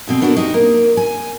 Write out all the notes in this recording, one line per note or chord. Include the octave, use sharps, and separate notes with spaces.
D2 B2 C4
B3 D4 F#4 A4 A#4
D#4 G4 A#4
A#3
G#5